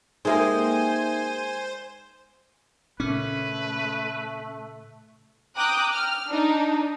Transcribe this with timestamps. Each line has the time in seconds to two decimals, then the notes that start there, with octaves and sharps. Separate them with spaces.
0.25 G#3 A#3 D#4 G4 C5 E5 G#5
3.00 A#2 C#3 A3 C#4 B4
5.57 G5 A#5 D6 D#6 F#6
5.92 F6
6.28 D4 D#4